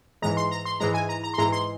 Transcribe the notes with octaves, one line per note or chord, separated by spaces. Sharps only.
G#2 E3 G#3 A#5
C6
A#5
C6
G#2 E3 G#3 A#5
G#5
A#5
A#5
C6
G#2 E3 G#3 A#5
C6